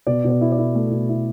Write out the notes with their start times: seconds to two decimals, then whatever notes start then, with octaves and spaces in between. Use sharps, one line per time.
0.07 B2 D5
0.24 B2 D5
0.41 E4
0.52 D5
0.58 E4
0.75 A3
0.92 B2
1.09 E4